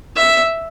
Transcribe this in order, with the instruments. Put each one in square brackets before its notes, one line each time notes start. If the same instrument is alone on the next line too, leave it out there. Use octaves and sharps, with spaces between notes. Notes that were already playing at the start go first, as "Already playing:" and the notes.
[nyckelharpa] E5